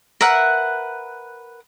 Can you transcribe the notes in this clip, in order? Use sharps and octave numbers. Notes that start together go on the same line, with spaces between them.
A#4 B4 E5 F#5